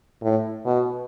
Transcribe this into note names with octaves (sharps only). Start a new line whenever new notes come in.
A2
B2